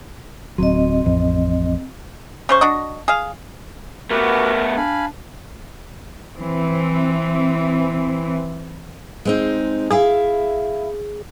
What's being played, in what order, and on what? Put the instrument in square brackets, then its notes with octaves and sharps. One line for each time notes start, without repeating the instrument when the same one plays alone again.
[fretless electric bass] D1 F#3 [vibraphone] C4 D#5
[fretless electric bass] A1 F2
[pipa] C#3 C5 C#6
D4 F#4 D#5
G#4 F5
[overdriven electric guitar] A3 B3 [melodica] F#4 G4 B4 [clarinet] A#4
[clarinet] D4 [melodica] F5 G#5 B5
[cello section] E3 C4
[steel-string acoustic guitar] G#3 C4 D#4
[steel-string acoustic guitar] E4 E5 F5 [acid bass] G#4